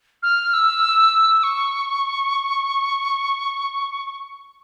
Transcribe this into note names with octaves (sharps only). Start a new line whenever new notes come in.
F6
E6
C#6